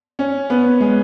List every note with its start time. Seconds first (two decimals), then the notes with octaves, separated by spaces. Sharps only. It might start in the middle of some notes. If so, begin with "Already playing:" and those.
0.19 C#4
0.50 B3
0.81 G#3